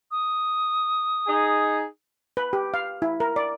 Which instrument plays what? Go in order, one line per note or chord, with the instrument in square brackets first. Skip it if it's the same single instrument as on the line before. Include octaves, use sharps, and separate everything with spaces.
[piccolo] D#6
[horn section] D#4 G#4
[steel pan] B4
G4
F5
E4
A#4
D5